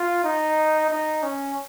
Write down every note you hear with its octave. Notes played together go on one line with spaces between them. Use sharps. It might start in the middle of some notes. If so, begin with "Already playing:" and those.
Already playing: F4
D#4
D#4
C#4